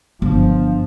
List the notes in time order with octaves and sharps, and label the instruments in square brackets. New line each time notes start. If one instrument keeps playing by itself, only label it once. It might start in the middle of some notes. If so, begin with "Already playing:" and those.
[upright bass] G1 [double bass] F3